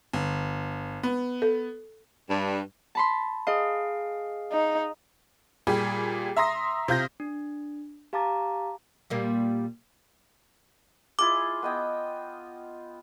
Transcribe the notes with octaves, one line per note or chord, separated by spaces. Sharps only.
G1
B3
A4
G2
A5 B5 C6
G#4 D#5 F5
D#4
A#2 G3 G4 G#4
E5 A#5 C6 D#6 A#6
C3 F4 G6 A#6
D4
G4 F5 A5 A#5 D6 A6
A#2 G3 A#3
E4 F4 G#4 D6
B3 D#5 G5